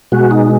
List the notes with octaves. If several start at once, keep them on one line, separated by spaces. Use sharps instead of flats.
B2 G#3 F#4
D#4